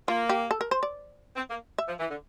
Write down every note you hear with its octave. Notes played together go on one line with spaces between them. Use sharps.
A#3 F4
G4
A4
A#4
C5
D5
C4
A#3
E5
F3
E3
D3